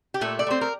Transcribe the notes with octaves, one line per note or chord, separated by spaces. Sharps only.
G4
A#2 A3 A4
D5
A3 C4 C5
A#4